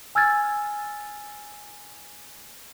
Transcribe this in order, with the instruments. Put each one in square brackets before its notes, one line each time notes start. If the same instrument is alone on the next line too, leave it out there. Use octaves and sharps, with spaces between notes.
[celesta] G#5 E6 F6 G#6 A6